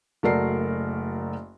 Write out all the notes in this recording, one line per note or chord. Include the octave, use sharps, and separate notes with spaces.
F#1 A3 F#4 A#4 D5 C7